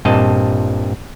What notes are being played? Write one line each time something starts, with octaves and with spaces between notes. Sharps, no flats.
G2 A#2 C4 D#5 A5